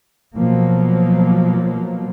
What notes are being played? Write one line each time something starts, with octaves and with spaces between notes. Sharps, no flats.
B2 F3 F#3 A#3